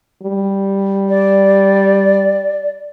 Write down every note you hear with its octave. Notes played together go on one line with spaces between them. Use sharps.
G3
D5